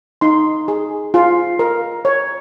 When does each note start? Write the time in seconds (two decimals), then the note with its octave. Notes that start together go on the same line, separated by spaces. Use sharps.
0.21 D#4 C6
0.68 G#4
1.14 F4
1.59 A#4
2.05 C#5